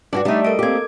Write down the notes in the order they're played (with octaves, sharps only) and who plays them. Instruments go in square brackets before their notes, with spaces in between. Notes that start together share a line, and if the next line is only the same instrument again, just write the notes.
[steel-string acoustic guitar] G2 [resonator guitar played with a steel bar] D4 E4 F#4
[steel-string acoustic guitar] G3 G4 [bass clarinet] A3 [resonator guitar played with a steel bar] D4 D#4
[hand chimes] A4 A#4 D7 [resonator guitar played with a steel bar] D#5
[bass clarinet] A#3 [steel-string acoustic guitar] C4 G4 [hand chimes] D6 G#6